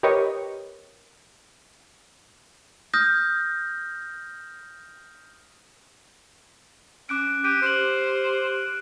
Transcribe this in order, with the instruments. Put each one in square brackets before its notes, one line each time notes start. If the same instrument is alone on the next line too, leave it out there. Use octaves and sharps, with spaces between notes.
[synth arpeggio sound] G4 A#4 B4 C#5 D#5
[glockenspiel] D#6 F6 G6 A#6
[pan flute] C#4 [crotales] D6 F#6 D7
[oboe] G4 [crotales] F#6 D7 D#7
[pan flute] G4 [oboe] C5 [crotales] F6 F#7